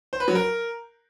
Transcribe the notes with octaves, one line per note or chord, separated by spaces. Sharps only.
C5
B4
F#3
A#4